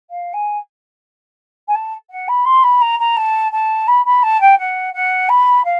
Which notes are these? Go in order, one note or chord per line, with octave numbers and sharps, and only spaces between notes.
F5
G#5
G#5
A5
F#5
B5
C6
B5
A#5
A#5
A5
A5
B5
B5
A5
G5
F#5
F#5
B5
F5